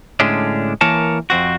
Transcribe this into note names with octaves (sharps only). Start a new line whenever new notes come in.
A2 D3 G#3 C#4 D4
E3 A#3 A#4 C#5 A5
F2 C4 F#4